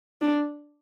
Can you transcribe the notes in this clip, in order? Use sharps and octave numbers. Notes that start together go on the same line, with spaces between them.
D4